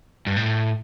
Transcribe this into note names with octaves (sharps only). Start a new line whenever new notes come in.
G2
A2